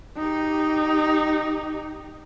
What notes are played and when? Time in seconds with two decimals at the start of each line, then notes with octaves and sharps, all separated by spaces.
0.18 D#4 G4